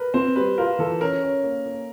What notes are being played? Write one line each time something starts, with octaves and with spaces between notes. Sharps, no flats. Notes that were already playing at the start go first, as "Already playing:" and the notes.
Already playing: A#4 B4
C4 C5
G3 B4
F4 A#4
E3 A4
C#4 A#4
C#4
A#3
A#3